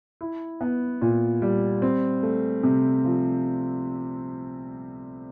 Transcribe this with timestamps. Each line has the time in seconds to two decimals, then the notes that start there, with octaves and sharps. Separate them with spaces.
0.21 E4
0.61 B3
1.02 A#2
1.42 G3
1.82 C4
2.23 A3
2.63 C3
3.04 F3